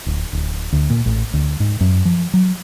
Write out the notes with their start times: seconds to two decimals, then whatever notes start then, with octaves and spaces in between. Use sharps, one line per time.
0.06 D1
0.33 D1
0.72 D2
0.90 A#2
1.06 A1
1.34 D2
1.60 G#2
1.81 F#2
2.05 F3
2.34 F#3